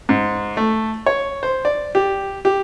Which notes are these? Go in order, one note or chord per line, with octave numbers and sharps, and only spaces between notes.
G#2
A3
C#5
C5
D5
G4
G4